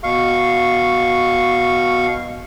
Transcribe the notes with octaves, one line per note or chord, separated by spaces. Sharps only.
B2 F5 C#6